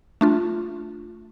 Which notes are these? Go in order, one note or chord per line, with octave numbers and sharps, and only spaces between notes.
A3 D4 F4